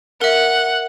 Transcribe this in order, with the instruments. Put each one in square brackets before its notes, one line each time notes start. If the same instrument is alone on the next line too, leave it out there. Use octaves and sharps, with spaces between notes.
[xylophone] A#4 E5 [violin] F#5